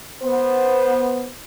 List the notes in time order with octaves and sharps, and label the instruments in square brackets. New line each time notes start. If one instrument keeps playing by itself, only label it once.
[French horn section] B3 C5